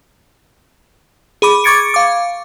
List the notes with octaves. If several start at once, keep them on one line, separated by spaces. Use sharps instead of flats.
G#4 B5 D6
C#6 D6 G#6 A6 C#7 D7
F5 D6